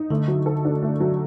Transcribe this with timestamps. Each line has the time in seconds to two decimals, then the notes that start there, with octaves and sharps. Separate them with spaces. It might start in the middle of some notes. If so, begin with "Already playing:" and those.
Already playing: D#4
0.11 D3 A3
0.28 F#3
0.46 A4
0.65 D4
0.83 A3
1.00 F#3